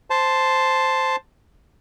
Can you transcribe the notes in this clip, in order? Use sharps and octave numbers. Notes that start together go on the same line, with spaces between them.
C5 A5